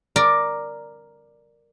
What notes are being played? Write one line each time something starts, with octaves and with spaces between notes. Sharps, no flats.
A#4 D5